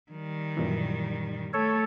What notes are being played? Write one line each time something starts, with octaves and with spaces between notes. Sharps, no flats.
D#3 G3
F#2 A#2 E3
A3 A4 C#5